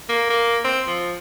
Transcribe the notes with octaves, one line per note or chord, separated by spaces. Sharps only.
A#3
A#3
C4
F3